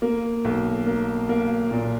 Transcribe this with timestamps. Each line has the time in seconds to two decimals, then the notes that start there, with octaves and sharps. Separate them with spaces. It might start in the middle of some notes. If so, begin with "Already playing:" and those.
0.02 A#3
0.45 B1
0.87 A#3
1.29 A#3
1.71 A#2